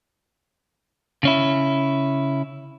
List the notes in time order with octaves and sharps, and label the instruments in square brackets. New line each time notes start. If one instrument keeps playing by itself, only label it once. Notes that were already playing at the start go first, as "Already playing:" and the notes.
[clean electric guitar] C#3 C#4 E4